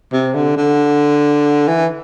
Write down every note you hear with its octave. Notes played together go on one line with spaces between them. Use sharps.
C3
D3
D3
E3